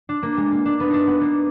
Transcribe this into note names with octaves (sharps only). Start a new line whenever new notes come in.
D4
A#3
G#3
A#3
D4
B3
D4 D#4
B3
A#3